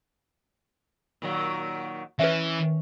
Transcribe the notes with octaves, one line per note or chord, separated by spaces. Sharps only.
A#2 D#3 F#3
E3 C#4 B4 E5